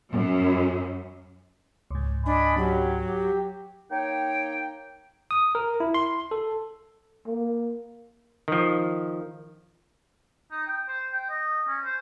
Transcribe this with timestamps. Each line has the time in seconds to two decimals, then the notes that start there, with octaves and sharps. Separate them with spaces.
0.10 F#2
1.91 C#2 G#2
2.26 D4 D#5 G#5 B5
2.58 F#3 C#4 F#4 G4
3.05 G4
3.91 A#3 D#4 C#5 G5
5.31 D#6
5.55 A#4
5.80 E4
5.94 C6
6.31 A4
7.27 A#3
8.48 D#3 F3
10.51 D#4
10.67 G5
10.88 C5
11.13 G5
11.30 D#5
11.68 C#4
11.85 C5